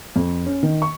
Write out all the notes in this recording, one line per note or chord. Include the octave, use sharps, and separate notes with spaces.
F2
C#4
D#3
C#6